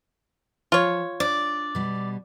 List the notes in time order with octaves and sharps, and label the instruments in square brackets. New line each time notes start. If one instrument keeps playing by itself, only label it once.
[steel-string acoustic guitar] F3 [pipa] F4 C#5
[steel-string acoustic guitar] D4 [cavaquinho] D5
[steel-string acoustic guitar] B2 G3